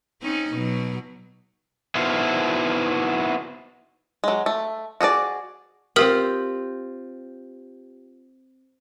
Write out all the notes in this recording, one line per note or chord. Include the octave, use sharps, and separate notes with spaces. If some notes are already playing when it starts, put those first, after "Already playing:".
C4 C#4 D#4
B2 F#3
B3 D#4 E4 F#4 C5 F5
F#3 G#3
A3
F#4 G#4 A4 D5
C4 F4 G4 A#4 D#6 F6